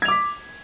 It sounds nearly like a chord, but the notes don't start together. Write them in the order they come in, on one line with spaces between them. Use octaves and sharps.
G#6 F7 D6 B6